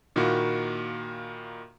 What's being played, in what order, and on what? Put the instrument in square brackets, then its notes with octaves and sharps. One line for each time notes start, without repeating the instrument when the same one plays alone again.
[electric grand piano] A#2 D#3 A#3 E4 F#4